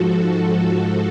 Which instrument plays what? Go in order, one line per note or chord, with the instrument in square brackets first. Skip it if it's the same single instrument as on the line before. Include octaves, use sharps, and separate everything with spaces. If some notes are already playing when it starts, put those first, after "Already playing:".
Already playing: [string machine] G#2 F3 F#4 A4